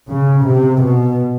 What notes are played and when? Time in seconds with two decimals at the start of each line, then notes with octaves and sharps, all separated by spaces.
0.10 C#3
0.47 C3
0.83 B2